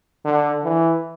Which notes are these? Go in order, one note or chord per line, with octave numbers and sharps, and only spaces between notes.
D3
E3